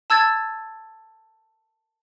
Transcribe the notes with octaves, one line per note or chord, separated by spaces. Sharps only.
A5 E6 G#6 A6